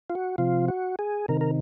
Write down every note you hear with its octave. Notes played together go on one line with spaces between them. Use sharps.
F4
F#4
C3 F3 F4
F#4
G#4
C3 D#3 A#4
A#4